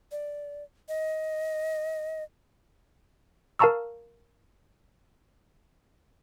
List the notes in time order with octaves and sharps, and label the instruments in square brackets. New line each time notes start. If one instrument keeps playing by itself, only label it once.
[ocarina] D5
D#5
[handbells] A#4 F5 A5 A#5 C#6 E6